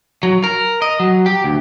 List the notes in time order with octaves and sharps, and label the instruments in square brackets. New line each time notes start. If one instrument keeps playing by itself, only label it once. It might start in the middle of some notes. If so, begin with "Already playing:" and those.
[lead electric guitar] F#3
A#4
D#5
F#3
G4
D2